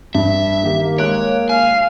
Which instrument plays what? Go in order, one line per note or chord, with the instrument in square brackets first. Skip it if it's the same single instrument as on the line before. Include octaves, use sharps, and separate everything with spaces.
[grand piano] G2 [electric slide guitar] E5
[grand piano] D#3 G4 [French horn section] A#3
[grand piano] G#3 F#6 D7 [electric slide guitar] C#5
[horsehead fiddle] F5 [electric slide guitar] G#5